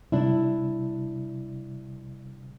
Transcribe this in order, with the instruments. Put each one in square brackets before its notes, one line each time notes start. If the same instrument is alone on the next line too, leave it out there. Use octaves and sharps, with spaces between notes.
[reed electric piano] C3 G3 [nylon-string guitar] D4 E4